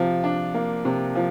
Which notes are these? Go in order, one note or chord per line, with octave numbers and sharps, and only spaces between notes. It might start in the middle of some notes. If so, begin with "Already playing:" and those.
Already playing: C3 F3
D4
A#3
C3
F3